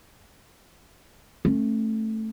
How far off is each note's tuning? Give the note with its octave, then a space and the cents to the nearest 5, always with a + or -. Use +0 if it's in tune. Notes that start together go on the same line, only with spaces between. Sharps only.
A3 +0 C#4 -40